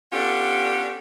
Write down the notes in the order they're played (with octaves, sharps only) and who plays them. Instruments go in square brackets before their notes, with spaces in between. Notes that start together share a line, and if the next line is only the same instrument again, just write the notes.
[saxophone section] B3 C#4 D4 F4 G4 A4